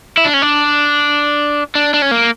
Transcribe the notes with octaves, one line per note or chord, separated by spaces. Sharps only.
E4
D4
C#4
D4
D4
D4
C#4
A#3